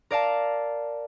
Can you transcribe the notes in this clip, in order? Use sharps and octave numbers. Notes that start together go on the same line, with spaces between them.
A#4 D5 F5 A5